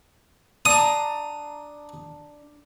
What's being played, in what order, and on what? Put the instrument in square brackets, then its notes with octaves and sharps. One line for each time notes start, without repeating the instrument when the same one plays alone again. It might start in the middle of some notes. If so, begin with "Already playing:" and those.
[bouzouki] D4 A#5 [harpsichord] D#6